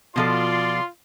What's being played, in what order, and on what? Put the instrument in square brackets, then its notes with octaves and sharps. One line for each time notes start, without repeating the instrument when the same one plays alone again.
[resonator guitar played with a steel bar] B2 F3 A4 [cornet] F4 [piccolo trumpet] D5 [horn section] C6